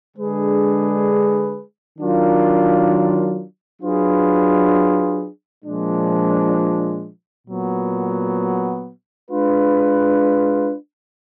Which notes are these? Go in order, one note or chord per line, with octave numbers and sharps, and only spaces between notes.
D3 G#3 D4 G#4 B4
D#3 F#3 D4 F4 A#4
F#3 D4 F4 G#4 B4
A#2 F3 G#3 D4
A#2 F#3 B3
G#3 D4 F4 B4